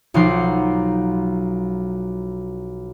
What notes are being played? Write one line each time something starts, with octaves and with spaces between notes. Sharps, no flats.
B1 F3 D#4 F#5 C6 D6